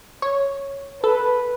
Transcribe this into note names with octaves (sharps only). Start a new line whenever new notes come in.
C#5
A4 B4